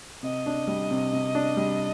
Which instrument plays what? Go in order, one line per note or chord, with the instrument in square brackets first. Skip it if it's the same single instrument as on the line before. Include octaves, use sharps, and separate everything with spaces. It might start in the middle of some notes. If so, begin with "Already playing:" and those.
[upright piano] C3 [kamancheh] D#5
[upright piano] D4
G3
C3
C3
D4
G3